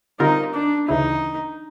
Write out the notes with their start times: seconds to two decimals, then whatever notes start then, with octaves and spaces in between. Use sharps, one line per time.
0.20 D3 G3 C4 D#4 F4 A#4
0.54 D4
0.88 D2 C#3 E3 D#4